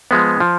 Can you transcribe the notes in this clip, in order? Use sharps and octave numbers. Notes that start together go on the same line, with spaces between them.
F3 G#3 B3
F3